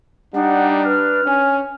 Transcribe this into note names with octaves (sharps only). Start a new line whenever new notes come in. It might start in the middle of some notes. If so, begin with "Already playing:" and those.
G3 D4 D#4 F#5
B4 F6
C#4 G#5